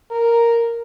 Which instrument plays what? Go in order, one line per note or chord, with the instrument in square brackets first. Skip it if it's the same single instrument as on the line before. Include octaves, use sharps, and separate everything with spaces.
[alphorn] A#4